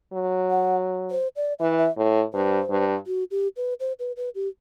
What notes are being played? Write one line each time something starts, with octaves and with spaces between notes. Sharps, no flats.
F#3
F#5
C5
D5
E3 E5
E5
A2
G2 C5
G2
F#4
G4
B4
C5
B4
B4
G4